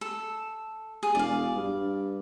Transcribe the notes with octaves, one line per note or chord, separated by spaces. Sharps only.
A4
G#4
E1 D5 F5
G2